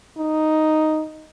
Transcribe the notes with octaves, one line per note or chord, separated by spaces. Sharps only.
D#4